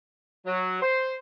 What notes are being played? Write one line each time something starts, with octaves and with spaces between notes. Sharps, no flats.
F#3
C5